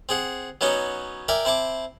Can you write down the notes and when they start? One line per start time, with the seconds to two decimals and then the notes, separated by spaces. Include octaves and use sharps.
0.09 C4 G#4 F#5
0.61 F#3 B3 C#4 D#4 F#4
1.28 A#4 D5 E5 G5 G#5
1.45 C4 E4 A5 D6